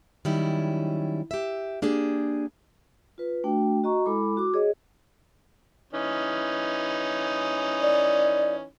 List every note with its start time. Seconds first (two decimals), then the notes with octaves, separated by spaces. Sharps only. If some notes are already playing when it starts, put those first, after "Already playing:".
0.25 D#3 F#3 G3 C#4 E4
1.31 G4 E5
1.82 A#3 D4 G4 G#4
3.18 F4 B4
3.44 A3 D4 F#4 G5
3.84 F#4 D#5 A#5 C#6
4.06 G#3 E4 A4 B5 D6
4.37 F#4 D6
4.54 G#4 C#5 D#5
5.93 E3 C#4 D#4
7.81 D5